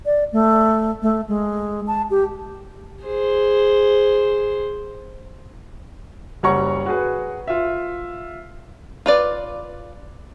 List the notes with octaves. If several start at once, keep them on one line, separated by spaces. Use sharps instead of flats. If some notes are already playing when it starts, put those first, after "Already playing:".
D5
A3
A3
G#3
A5
G4
G#4 C5
F#1 G3 C#5 F#5 A#5 C#6
F#4 G#4 B4
F4 E5
F4 B4 D5